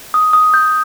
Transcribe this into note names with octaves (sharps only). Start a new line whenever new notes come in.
D#6
D#6
G6